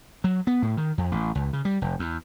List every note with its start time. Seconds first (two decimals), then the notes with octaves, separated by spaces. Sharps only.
0.24 F#3
0.47 B3
0.62 A2
0.77 D#3
0.98 F2
1.12 A1
1.35 C#2
1.53 C#3
1.65 G3
1.82 F1
1.99 E2